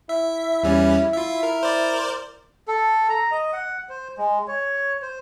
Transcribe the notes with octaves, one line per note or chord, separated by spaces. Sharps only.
E4 E5
E2 G3 C#4
F4 E5
A#4
A#4 C5 D5
A4
A#5
D#5
F#5
C5
G#3
C#5
C5